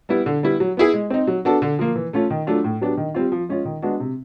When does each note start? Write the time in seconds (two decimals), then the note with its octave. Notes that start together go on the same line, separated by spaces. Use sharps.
0.09 G3 B3 E4
0.26 D3
0.43 G3 B3 E4
0.60 F#3
0.77 B3 E4 G#4
0.94 G#3
1.10 C4 D#4
1.27 F#3
1.45 B3 D4 F#4 A4
1.62 D3
1.79 F3 A#3
1.96 E3
2.13 A3 C#4 F4
2.30 D#3
2.47 F#3 A3 D4 F4
2.64 A2
2.81 F#3 B3 D4 G4
2.97 D#3
3.14 G3 C4 F4
3.32 F3
3.49 G#3 C#4 F4
3.65 D#3
3.82 G#3 B3 D4 F#4
4.00 C3